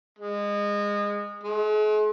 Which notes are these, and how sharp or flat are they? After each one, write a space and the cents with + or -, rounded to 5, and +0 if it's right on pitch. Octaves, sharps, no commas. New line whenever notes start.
G#3 -25
G#3 +45